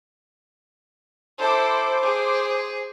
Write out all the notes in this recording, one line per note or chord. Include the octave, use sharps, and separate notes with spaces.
E4 A4 C5 D6
G#4